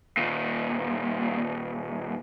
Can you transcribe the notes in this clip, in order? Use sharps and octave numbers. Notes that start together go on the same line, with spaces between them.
D#2 A#2